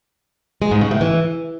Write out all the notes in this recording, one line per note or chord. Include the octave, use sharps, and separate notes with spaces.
G#3
G#2
C#3
A2
E3